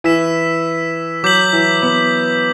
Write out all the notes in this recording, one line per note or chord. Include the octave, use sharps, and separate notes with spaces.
E3 E6 B6 E7
F#3 D6 G6 B6 F#7
E3
B3